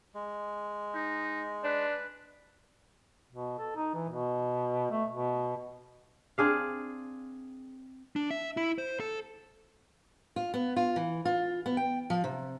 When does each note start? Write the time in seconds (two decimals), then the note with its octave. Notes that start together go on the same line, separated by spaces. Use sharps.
0.14 G#3
0.94 D#4
1.64 D4 B4
3.32 B2
3.59 A4
3.76 D#4
3.95 E3
4.09 B2
4.91 A3
5.10 B2
6.38 C4 D4 G#4 F5
8.16 D4
8.31 E5
8.57 E4
8.78 C5
9.00 A4
10.36 F4
10.54 B3
10.76 F4
10.96 E3
11.25 F4
11.66 B3
11.77 G5
12.10 F3
12.24 C3